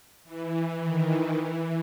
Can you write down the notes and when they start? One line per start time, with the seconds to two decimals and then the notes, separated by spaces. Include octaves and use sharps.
0.25 E3
0.82 D#3
1.36 E3